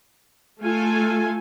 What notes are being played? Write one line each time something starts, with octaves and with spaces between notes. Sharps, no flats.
A3 F4 A4 G#5